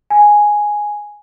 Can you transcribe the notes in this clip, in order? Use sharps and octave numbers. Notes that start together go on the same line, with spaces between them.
G#5